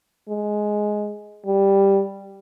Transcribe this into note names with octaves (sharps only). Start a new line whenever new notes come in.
G#3
G3